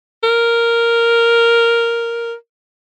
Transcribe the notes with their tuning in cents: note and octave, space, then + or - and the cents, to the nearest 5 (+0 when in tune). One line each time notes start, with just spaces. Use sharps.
A#4 +0